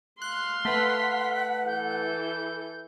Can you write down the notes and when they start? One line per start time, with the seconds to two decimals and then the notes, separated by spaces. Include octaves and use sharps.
0.22 F5 C6 F#6
0.65 A3 B4 F#5 B6
1.67 E3 A4 G6